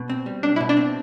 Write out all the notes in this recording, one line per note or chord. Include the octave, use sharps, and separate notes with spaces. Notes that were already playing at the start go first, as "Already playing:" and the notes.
Already playing: B2
C4
G3
B1 D4
B2 E4
D4
C4